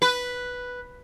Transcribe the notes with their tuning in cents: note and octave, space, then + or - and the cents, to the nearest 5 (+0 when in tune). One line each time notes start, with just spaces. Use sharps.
B4 +0